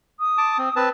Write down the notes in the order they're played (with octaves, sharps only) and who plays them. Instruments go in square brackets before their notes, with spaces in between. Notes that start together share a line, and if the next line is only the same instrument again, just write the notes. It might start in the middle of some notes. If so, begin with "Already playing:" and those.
[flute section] D#6
[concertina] A5 D6
C4
C4 B4 A5